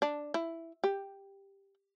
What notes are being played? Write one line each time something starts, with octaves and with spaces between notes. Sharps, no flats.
D4
E4
G4